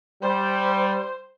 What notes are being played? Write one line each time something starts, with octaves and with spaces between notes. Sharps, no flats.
G3 C5